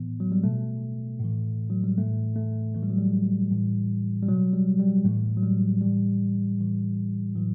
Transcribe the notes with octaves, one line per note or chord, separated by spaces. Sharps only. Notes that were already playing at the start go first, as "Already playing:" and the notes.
Already playing: A2 E3 B3
F#3
G3
B2 A3
A2 E3
F#3
G3
A2 E3 A3
A3
A2 E3 A3
G3
F#3
G3
A2 E3
G3
B2 F#3
G3
G3
A2 E3 A3
F#3
G3
A2 E3 G3
A2 E3
A2 E3 F#3